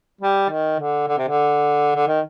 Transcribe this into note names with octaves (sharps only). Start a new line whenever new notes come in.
G3
D#3
D3
D3
C3
D3
D3
D#3